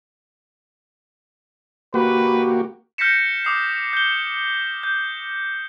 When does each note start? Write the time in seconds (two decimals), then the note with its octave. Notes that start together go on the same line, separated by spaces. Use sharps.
1.94 A#3 F#4 G4 B4
2.98 F6 G6 A#6 B6 C#7 E7
3.45 D6 D#6 C7
3.93 G6 G7
4.83 G6